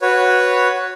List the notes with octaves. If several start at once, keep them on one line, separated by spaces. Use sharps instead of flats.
F#4 B4 C#5